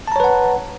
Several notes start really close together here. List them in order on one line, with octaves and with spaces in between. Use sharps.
A5 A#5 C#5 B4 F#5